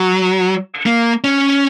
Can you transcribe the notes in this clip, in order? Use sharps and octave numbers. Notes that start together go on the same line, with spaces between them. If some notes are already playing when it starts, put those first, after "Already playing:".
Already playing: F#3
A#3
C#4